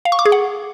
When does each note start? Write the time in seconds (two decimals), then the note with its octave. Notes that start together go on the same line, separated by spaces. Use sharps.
0.05 F5
0.12 C#6
0.19 D6
0.25 G#4
0.32 F#5